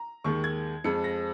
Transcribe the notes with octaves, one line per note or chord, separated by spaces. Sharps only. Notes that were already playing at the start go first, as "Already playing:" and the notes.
Already playing: A#5
D#2 D#3 G#3 C#6
G#6
F2 F3 G#3 C#7
A#6